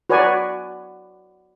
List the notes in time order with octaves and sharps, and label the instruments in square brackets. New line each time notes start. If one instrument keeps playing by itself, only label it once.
[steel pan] F#4 B4 C#5 D5 G#5